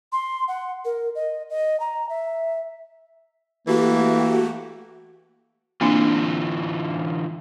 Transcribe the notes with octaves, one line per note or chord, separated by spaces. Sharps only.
C6
F#5
A#4
D#5
D#5
A#5
E5
E3 A3 A#3 F#4 G4
D3 E3 A#3 C4 D4 F4